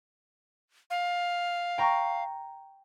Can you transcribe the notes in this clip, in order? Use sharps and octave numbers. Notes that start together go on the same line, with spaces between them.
F5
G5 A#5 C#6